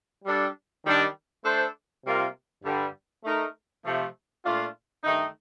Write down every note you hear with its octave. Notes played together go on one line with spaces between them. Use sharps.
G3 D4 A4
D#3 G3 D4
A3 D4 A4 C5
C3 G3 A#3 F4 A#4
G2 D3 G3
A3 D#4 A#4
C3 F3 A3
A#2 A3 D4 F4
G2 D#3 A3 D#4